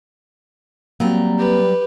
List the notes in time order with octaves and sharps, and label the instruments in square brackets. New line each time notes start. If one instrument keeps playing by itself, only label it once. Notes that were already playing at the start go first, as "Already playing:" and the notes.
[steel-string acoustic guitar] F#3 G3 A#5 [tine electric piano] A#3 C4
[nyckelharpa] G4 B4